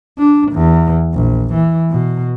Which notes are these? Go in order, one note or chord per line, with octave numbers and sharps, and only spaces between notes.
D4
E2
A#1
E3
B2